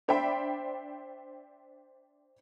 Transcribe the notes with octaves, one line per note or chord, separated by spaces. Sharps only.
D4 C5 D5 E5 G5 B5